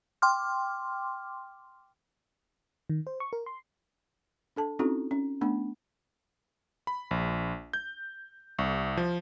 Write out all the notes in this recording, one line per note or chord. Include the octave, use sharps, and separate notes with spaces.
G5 C6 D6 F6
D#3
C5
C#6
A#4
C6
D4 A4 A5
C4 C#4 D#4 E4 F#4 A4
C#4
A3 B3 D4
B5
A#1
G6
C2
F3